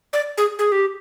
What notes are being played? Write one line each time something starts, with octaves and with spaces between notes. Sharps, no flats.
D5
G#4
G#4
G4